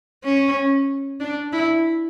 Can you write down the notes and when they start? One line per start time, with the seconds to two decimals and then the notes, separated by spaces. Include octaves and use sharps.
0.25 C#4
1.20 D4
1.53 E4